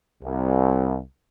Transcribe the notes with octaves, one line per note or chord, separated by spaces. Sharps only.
C2